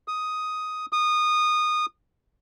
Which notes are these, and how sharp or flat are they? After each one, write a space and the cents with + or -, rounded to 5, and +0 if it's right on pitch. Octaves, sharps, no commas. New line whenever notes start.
D#6 +5
D#6 -20